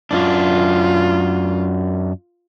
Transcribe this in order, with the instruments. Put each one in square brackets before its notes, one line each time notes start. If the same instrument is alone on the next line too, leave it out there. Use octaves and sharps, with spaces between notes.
[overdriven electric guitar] F#2 D4 [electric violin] F4